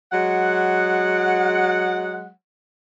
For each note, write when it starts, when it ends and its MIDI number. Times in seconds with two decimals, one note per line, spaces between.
0.13 2.29 54
0.13 2.29 56
0.13 2.29 78